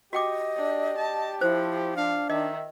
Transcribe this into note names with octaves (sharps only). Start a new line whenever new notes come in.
F#4 G4 D#5 G5 D6
D4
A5
F3 E4 C5
D4 F5
D#3 D#5 E5